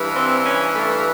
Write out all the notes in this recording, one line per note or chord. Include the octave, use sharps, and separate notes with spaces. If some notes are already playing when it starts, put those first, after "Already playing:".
Already playing: G2 E3
C4
C#4
A3